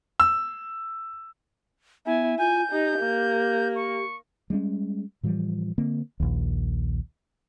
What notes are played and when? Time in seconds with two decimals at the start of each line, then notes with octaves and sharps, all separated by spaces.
0.20 E6
2.06 B3 E4 G#5
2.39 F4 G#5 G6
2.72 D#4 G4
3.00 A#3
3.75 C#6
4.50 G3 G#3 C4 C#4
5.23 A2 E3 F3 G3
5.78 D3 A#3 C4
6.20 A#1 D#2